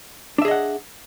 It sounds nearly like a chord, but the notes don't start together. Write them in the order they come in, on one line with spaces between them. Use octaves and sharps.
D4 E5 G#4 D#5 F#5